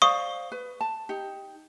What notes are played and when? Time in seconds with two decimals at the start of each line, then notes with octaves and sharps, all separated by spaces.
0.02 C5 D5 F5 C#6 D#6
0.52 B4
0.81 A5
1.09 D#4 G4